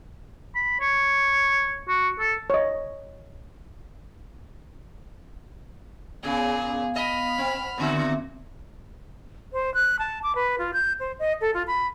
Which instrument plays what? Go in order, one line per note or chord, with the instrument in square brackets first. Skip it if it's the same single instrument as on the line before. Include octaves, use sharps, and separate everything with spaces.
[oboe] B5
C#5
F#4
A4
[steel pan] C#5 D#5
[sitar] A#2 C#3 [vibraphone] B3 F5 [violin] G#4
[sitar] D#5 [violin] B5 F6
[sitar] C4 [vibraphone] F#5
[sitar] A#2 D3 F#4 [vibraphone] B3 C4 E5
[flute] C5
F#6
A5
D6
B4
F4
G6
C5
D#5
A4
F4
B5